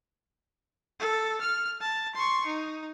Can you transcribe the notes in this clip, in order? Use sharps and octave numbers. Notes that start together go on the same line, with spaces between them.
A4
F6
A5
C6 C#6
D#4